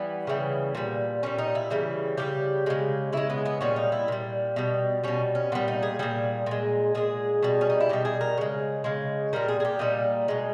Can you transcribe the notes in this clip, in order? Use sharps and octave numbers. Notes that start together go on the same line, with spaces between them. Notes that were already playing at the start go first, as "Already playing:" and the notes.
Already playing: E3 G3 B3
C#3 E3 G3
A#2 G3
A#2 G3 C#4
D#4
E4
C#3 E3 G3
C#3 E3 G3 G4
C#3 G#3
C#3 G#3 E4
B3
B3
A#2 G3 C#4
D#4
E4
A#2 G3
B2 G3
B2 G3 C#4
C#4
A#2 G3 B3
D#4
G#4
A#2 G3 G#4
A#2 G#3
A#2 G#3 G#4
B2 G3
C#4
D#4
E4
B2 G3 G4
G#4
A#4
C#3 G#3
C#3 G#3
A#2 G3 A#4
G#4
G#4
G4
A#2 G3 D#4
B2 G#3